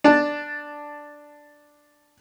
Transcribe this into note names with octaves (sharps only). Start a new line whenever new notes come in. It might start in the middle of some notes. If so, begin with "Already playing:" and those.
D4 A5